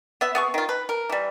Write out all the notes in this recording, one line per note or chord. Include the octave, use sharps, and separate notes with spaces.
B3 E5
B3 G#4 C#6
D#3 F4
B4
A#4
E3 G3